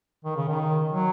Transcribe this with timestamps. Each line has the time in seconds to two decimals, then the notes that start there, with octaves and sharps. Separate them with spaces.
0.25 D#3
0.36 C#3
0.48 D#3
0.92 F#3